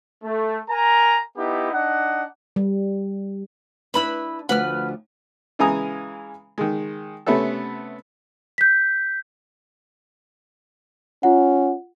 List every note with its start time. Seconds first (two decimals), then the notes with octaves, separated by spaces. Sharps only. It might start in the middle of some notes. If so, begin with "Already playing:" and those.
0.24 A3
0.69 A#4 G#5 A#5
1.37 B3 D#4 E4 G4
1.72 D4 D#4 F#5
2.56 G3
3.94 D4 E4 B4 B5 E6
4.49 D2 F3 B4 F#5 F6
5.59 C#3 E3 G#3 G#5 A#5 D#6
6.58 D#3 G#3
7.26 C3 A3 B3 C#4 A4
8.58 G6 B6
11.23 C#4 F4 F#5